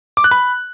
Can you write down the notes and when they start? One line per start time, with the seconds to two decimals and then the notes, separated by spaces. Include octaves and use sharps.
0.17 D6
0.24 F#6
0.31 B5